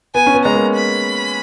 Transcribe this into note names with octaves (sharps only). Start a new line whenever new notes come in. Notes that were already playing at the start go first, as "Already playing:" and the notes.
B3 G#5
C#4
B3
G#3 A#5
A#3
B5